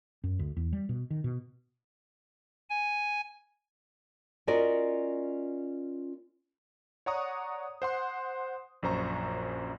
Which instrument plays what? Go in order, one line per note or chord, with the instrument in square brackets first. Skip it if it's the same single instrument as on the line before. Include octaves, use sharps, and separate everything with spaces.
[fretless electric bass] F#2
D2
E2
G3
B2
D#3
B2
[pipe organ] G#5
[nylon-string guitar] C#4 F4 F#4 A#4 D5 D#5
[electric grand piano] C#5 D5 F#5 A#5 C#6 D#6
C5 F#5 C6
A#1 F#2 C5 A#5 C#6